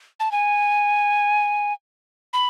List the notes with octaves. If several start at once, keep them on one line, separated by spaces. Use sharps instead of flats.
A5
G#5
B5